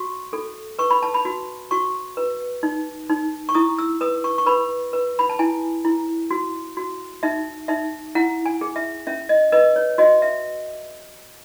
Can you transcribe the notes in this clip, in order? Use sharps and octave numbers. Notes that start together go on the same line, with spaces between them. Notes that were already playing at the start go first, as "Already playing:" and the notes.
Already playing: F#4 C#6
A4
B4 C#6
B5
A5
B5
F#4
F#4 C#6
B4
D#4
D#4
C#6
E4 D#6
E6
B4 D#6
C#6
C#6
B4 B5
B4
B5
A5
E4 G#5
E4
F#4
F#4
D#4 E5
D#4 E5
E4 F#5
G#5
G#4
E5
C#4 E5
D#5
B4 D#5
C#5
F#4 D#5
E5